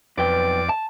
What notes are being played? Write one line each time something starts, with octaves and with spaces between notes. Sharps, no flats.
B1 F2 B4 D5 G5 D6
A5